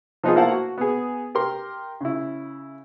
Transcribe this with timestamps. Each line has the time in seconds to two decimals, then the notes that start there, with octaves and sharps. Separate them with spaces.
0.23 F3 B3 D#4 F4 G#4
0.36 A#3 E4 C5 F5 F#5 A5
0.51 F#4
0.78 B3 G#4
1.35 G4 A#4 C6
2.01 C#3 E4